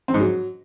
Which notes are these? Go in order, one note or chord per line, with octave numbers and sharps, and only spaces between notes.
C4
G#2
F#3